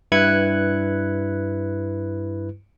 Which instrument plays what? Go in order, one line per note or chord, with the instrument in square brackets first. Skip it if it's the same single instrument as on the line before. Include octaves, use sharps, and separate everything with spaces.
[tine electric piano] G2 E4 B4 F#6 G#6 C#7